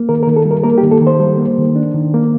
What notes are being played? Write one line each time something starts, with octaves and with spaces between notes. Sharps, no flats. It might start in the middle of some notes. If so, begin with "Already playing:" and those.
Already playing: A#3
D#3 A#4
A#4
D#3
A4
G3
A#4
A#3 A#4
G4
D#3
A4
D#3
C5
G3
A#3
D#3
D4
D#3
A#3